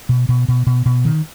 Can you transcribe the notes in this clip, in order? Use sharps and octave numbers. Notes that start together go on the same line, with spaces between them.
B2
B2
B2
B2
B2
D#3